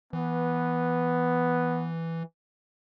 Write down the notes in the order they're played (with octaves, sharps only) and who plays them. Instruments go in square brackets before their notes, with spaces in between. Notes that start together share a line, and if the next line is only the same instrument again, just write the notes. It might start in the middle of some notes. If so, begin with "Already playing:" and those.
[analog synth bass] E3 [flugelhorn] B3